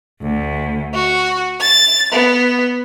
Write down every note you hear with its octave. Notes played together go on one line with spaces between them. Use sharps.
D2
F#4
A6
B3